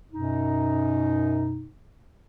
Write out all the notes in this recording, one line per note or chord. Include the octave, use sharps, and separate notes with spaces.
F#2 B2 D#4